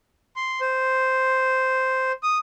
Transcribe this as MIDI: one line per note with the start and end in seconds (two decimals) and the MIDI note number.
0.36 0.60 84
0.61 2.12 72
2.23 2.38 87